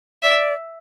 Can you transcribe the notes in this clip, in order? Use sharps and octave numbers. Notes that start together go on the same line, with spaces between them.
D5 E5